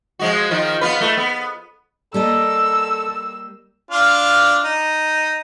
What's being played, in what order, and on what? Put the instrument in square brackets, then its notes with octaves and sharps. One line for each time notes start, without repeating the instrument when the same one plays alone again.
[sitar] F3 G#3 F#4
D#3 F3 F4
B3 F4 B4
A3
B3
[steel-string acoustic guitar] G3 A#3 D#5 [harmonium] A4 [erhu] E6
[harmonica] D4 F4 F6
D#4